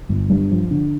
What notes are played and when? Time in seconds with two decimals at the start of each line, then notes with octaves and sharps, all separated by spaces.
0.09 G1
0.30 G2
0.51 F3
0.71 D3